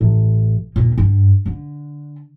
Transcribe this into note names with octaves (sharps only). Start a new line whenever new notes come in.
A1
D#2 A#2
G2
D3